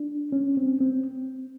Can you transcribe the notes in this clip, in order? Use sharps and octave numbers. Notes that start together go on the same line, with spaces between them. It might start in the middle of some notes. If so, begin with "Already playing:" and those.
Already playing: D4
C#4
C4
C4